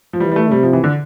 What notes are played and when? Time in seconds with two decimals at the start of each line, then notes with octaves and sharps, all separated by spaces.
0.13 F3
0.20 E3 G3
0.31 G3
0.36 A3
0.51 C3 G3
0.63 F3
0.73 E3
0.84 D3